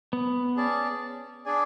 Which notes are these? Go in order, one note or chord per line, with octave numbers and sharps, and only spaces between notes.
B3
C#4 G#4 D5 A5
D4 G#4 D5 G#5